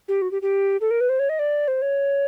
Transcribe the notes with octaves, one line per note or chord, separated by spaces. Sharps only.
G4
F#4
G4
G4
A4
A#4
B4
C5
C#5
D#5
D5
C5
C#5